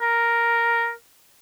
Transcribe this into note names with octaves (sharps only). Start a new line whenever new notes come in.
A#4